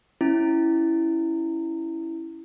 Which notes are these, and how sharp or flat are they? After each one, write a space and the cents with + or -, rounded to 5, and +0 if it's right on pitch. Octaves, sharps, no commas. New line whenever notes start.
C#4 +0 E4 +0